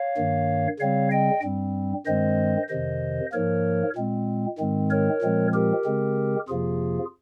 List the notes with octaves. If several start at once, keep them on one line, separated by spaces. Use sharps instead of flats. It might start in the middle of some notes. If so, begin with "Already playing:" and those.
Already playing: C#5 F5
G2 D#3 A#3
C#3 G3 C4 C#5 F5
D#5 G5
G2 G3 C4
G2 D#3 G#3 C4 C5 D#5
F2 C3 D#3 C5 D#5
G#2 F3 A#3 A#4 C#5
A#2 G#3 C4
G#2 D#3 G#3 C4
A#4 C#5
A#2 F3 G#3 C4
G4 A#4
C#3 G#3 C4
F2 C3 F3 A#3 F4 G#4